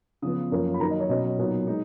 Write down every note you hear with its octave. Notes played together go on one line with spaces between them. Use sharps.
C#3 F3 B3 D#6
F#2 F3 A#3 C#4
B5
D#3 F#3 A#3 A#5
D#5
C#5
B2 F#3 C#4 D#5
A#2 F#3 B3 D#4
G#3 D#4